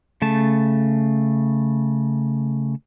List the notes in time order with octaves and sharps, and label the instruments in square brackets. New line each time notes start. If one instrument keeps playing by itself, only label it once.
[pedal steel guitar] C#3 A3 A5